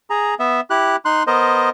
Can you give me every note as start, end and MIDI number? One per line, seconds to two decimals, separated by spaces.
0.10 0.34 68
0.10 0.34 82
0.39 0.61 59
0.39 0.61 76
0.70 0.96 64
0.70 0.96 67
0.70 0.96 90
1.05 1.23 63
1.05 1.23 84
1.05 1.23 90
1.27 1.70 59
1.27 1.70 70
1.27 1.70 72
1.27 1.70 75